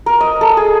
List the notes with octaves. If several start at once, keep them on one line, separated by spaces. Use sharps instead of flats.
A#4
D#5
A4
G#4